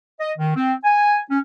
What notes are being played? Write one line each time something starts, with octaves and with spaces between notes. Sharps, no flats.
D#5
D#3
C4
G#5
C#4